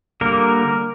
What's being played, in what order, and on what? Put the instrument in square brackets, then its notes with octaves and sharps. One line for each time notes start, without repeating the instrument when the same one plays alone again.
[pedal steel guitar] D3 G3 A#3 A#4